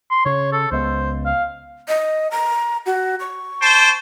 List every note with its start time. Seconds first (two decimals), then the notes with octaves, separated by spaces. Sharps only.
0.11 C6
0.26 C#3 C#5
0.53 A4
0.72 C#2 G#3 B3 C5
1.26 F5
1.88 D#5
2.31 A#5
2.86 F#4
3.20 C#6
3.60 C5 G5 A5